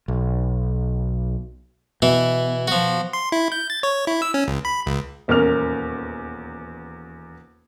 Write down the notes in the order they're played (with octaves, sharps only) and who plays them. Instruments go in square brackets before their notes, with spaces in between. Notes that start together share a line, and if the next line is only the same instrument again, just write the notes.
[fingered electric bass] B1
[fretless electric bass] B2 [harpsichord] E3 E4
[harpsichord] F3 F#4
[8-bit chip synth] C6
E4
G6
A6
C#5
E4
E6
C#4
C#2
B5
C#2
[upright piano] D#1 E2 C#4 A#4 F6 F7